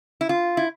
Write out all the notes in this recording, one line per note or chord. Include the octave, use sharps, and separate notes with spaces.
E4
F4
E4